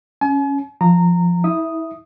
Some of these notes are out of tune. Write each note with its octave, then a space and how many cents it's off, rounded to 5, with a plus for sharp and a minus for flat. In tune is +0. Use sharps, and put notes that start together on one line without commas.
C#4 +0 G#5 +40
F3 +0 A#5 -20
E4 -30 E5 +0 D#6 +0